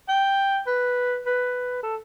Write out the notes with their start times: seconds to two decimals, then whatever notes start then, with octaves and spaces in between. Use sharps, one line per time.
0.09 G5
0.67 B4
1.26 B4
1.83 A4